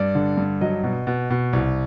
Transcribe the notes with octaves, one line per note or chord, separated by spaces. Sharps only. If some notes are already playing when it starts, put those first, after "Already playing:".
Already playing: G2 D5
D3
G2
F#3 D#5
B2
B2
B2
C2